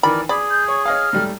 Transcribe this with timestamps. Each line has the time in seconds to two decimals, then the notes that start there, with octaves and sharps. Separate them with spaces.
0.03 D#3 E3 A#4 D5 B5
0.29 G#4 D5 B5 D6
0.51 G6
0.68 C#5 C#6
0.86 C#5 D#5 F5 F6
1.13 G#2 G3 A3